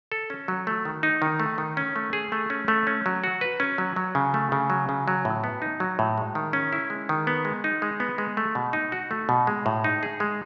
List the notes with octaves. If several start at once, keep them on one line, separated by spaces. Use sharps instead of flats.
A4
C#4
F#3
A3
D#3
D#4
D#3
A3
D#3
C#4
A3
G#4
A3
C#4
A3
C#4
F#3
F#4
B4
C#4
F#3
F#3
C#3
A3
C#3
F#3
C#3
F#3
A2
B3
D#4
F#3
A2
G#3
D#3
C#4
E4
G#3
D#3
B3
G#3
D#4
G#3
B3
G#3
A3
B2
D#4
F#4
A3
B2
G#3
A2
D#4
G#4
G#3